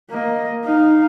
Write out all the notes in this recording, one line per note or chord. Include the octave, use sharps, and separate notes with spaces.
A#3 D#5
D#4 F5